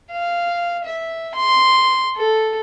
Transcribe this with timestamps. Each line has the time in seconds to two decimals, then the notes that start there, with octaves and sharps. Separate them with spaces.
0.12 F5
0.85 E5
1.35 C6
2.17 A4